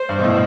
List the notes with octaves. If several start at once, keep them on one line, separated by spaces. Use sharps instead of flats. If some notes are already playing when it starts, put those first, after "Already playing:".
Already playing: C5
G2
B2
A2